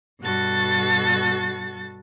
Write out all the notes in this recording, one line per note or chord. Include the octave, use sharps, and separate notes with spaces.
G2 B2 F#4 A4 A6